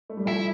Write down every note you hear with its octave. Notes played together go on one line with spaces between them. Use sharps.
A3
G3
F3 A3 E4